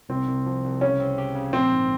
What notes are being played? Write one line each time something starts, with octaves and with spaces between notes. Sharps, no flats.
C2 C4
C2
F3
C2
C#3 C#4
C4
G4
C#3
A#1 C4
G#2